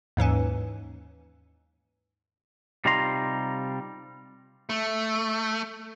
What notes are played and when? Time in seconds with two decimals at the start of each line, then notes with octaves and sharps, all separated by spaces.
0.17 D#2 G#2 E3 C#4
2.85 C3 G3 D#4 F4 A#5 C6
4.69 A3